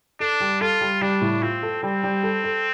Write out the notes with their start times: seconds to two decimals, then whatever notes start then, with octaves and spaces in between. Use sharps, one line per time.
0.20 D4 A4
0.40 G3
0.61 F4 A4
0.81 G3
1.01 G3 D4
1.21 A2
1.42 C4 F4
1.63 A4
1.83 G3 C4
2.04 G3
2.23 A4
2.44 A4